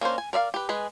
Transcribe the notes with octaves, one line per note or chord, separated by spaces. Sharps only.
A#3 C#4 D4 C5
G#5
A#4 D5 E5 F5
G4 B4
G#3 G#4 B4